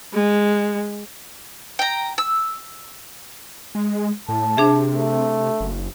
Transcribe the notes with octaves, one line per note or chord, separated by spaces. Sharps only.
G#3
G5 A#5
E6
G#3
A2 A5
C3 D4 G#4 E5
A3
F#1